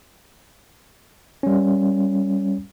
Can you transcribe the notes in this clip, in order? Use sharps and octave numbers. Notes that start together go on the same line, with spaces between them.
G3 C#4